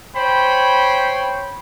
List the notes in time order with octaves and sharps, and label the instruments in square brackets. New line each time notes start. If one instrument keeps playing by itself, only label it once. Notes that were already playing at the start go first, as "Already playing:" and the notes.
[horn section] C5 C#5 G5 B5